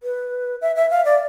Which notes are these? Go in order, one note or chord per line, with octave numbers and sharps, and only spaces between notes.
B4
E5
E5
F5
D5